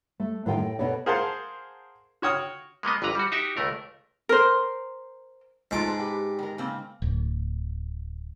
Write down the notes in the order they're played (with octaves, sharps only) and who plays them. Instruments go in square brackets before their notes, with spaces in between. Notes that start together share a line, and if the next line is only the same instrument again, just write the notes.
[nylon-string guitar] A3
A2 D#3 F4 F#5 G5
A2 G5
B2 B3 A4 A#4 C#5 D5
[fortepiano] G#4 A#4 C5 F5 F#5 A5
F#4 C#5 G5 D#6 F6
[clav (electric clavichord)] G#3 A#3 B3 D#5
G1 F2 D3 B4 A#5
G3 F#4
D#4 F#4 G4 E5
C#2 A3 A#4
[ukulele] A#4 C5
[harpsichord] G#2 D6 [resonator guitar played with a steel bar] A3 F4 A5
[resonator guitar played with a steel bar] G#4 B4
G4 B4
D#3 A#4
C#3 A#3 C4
[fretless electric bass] D1